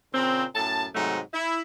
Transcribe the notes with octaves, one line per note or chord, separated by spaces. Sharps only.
A#2 C#3 C4
F#2 A2 A5
G#2 C3 F#3 A3 D#4
E4